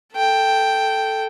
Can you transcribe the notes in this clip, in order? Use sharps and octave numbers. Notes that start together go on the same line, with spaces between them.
A4 G5